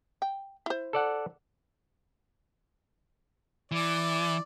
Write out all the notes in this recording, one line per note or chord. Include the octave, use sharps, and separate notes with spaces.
G5
E4 C5
A4 D5 F#5
E3 D5